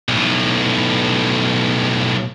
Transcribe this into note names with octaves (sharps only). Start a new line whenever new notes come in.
B1 A2